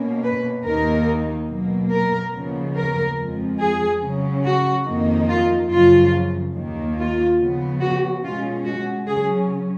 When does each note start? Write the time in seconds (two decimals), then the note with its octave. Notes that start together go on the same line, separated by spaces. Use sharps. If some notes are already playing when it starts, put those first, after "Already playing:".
Already playing: B2 A#3 C#4
0.24 B4
0.65 D#2 D#3 A#3 D#4 A#4
1.49 B2 F#3 A#3
1.92 A#4
2.33 D#2 C#3 F3 B3
2.76 A#4
3.18 F2 F3 G#3
3.60 G#4
4.02 C#3 F#3 C#4
4.45 F#4
4.86 F2 D#3 A#3 D#4
5.29 F4
5.70 F#2 C#3 F3 F4
6.56 D#2 D#3 A#3
6.97 F4
7.40 C#3 F3 B3
7.81 F#4
8.23 B2 G#3 C#4 F4
8.65 F#4
9.07 C#3 F#3 C#4 G#4